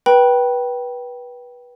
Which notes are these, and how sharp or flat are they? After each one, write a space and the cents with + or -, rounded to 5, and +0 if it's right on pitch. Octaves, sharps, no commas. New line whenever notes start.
B4 -20 G5 -10 B5 -30